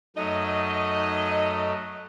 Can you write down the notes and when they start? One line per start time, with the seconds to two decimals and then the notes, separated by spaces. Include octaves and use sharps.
0.16 F#2 F#3 A3 D#4 D#5